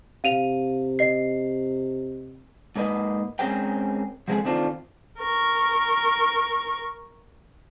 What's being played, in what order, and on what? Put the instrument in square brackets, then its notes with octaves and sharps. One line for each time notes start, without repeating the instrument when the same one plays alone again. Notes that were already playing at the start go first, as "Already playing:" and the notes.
[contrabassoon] C3 [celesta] F5 D#7 F7
[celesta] D#5 C7
[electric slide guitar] G#2 A#3 B4 D#5
G#3 C4 C#4 G#4 A#4 G5
F3 F#3 G#3 A3 C4 G#4
D#3 A3 C4 D4 F4 C5
[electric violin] A#4 C#6